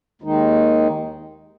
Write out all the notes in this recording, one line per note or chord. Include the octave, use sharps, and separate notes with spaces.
D#2 D#3 G#3 D#4